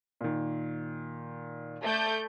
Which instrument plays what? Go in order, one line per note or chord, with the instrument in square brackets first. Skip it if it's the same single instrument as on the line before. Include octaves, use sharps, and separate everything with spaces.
[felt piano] A#2 D#3
[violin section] A3 D5 G6